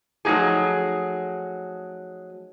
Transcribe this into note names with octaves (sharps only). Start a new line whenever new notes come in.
F3 F#3 A3 D#4 G4 G#4